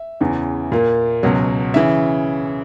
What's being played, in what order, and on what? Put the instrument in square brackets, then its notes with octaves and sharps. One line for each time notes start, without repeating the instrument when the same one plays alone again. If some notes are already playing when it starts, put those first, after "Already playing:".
Already playing: [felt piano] E5
E2 C#3 E3
A#2 A#3
C#2 B2 F#3
C#3 E3 E5